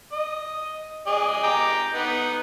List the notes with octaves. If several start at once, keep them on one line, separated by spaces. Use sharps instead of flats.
D#5
G#4 D5 D#5
G5 A#5 D6
B3 D#4